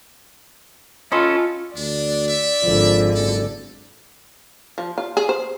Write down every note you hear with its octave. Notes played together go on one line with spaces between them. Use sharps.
C#4 F4 A4 D#5 B5 C6
D2 D4 D5
E5
G#1 D3 F3
F#1 A4
F3
F4
G#4
C5